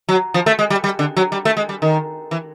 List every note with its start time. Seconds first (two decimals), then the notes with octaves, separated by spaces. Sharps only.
0.09 F#3
0.34 F3
0.46 A3
0.59 G#3
0.70 G3
0.84 G3
0.99 D3
1.17 F#3
1.32 G3
1.45 A3
1.57 G#3
1.69 G3
1.82 D#3
2.31 E3